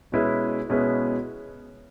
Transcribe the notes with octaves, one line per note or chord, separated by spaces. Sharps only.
B2 G#3 C#4 E4 B4
B2 G#3 C#4 E4 B4